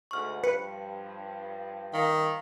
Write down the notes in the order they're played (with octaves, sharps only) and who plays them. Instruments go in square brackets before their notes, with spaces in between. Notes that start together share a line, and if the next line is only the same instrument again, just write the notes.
[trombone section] D2 G#2 [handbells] C#6 F6
[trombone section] G2 F3 [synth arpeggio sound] B4 [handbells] C#7
[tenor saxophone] D#3 [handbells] F5